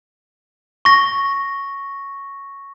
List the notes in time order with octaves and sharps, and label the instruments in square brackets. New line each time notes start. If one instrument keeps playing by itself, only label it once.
[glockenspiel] C#6 A#6